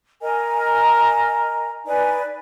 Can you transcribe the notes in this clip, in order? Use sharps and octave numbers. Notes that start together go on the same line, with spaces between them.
A#4 D#5 G#5 A#5
D#4 B4 D5 G#5